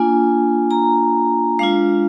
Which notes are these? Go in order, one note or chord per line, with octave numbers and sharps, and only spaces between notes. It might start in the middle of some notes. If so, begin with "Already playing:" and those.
Already playing: A#3 D4 F4 G#5
A#5
G#3 D4 F4 F5